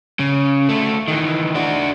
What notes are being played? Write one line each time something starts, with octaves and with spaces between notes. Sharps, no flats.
C#3
D2 A3
D#3 E3
D4 F#4